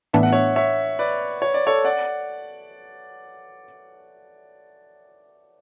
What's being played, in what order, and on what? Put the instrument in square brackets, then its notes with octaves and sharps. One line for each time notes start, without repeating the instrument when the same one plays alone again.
[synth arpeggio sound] A2 E3 B3 D4 [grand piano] E5
[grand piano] F#5
C#5 E5
C#5 E5
B4 D5
C#5
D5
A4 C#5
D5 F#5